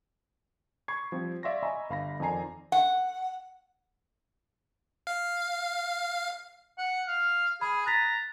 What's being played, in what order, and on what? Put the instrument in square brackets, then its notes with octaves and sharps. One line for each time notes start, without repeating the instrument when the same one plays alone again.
[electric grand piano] B5 C#6 D6 G#6 C7
F3 G3 C4
D5 E5 F5 C6 C#6 A#6
D#5 E5 G#5 A#5 B5 C#6
G1 F5 B5 A#6
F2 D#3 D5 G#5 A#5 C7
[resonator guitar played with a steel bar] F#5
[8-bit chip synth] F5
[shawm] F#5
F5
[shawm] G#4 [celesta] B5
[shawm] A#5 [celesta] F#6 A6 B6